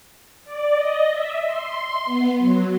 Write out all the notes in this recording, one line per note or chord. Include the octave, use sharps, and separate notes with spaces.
D5
D#5
E5
C6
B3
F#3